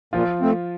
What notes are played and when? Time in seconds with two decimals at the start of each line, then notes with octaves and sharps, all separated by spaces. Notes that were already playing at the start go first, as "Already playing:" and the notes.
0.13 A#2 F3 F4
0.41 A3 C4